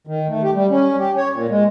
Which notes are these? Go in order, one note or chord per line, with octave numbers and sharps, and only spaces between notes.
D#3
A3
G4
G3
C#4
G4
C#5
A#2
G#3